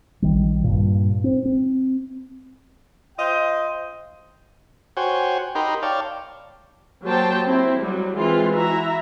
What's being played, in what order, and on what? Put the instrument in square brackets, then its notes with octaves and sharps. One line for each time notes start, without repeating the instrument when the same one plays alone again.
[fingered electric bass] A#1 D#3 G3
G2 A#2
C4
C4
[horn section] F4 C5 D#5 G5
[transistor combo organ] F#4 C5 C#5 G5 G#5
D#4 G4 A#4 G5 B5 C6
C#5 D5 F5 G5 A5
[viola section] F#3 A#3 G4 C5 G5 A5
C4 E4
F#3 G3
E3 G#3 C4 F4
E4 F#4 E5 A#5